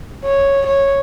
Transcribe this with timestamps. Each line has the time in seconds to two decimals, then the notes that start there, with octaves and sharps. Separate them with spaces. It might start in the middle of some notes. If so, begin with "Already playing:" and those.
0.25 C#5
0.66 C#5